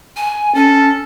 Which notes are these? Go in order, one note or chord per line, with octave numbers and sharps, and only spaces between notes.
G#5
C#4 A4